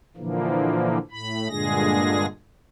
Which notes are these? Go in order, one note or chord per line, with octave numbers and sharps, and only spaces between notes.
A#2 D3 E3 F3 A#3
A2 B5
G2 A#2 D3 G#3 G#4 A#6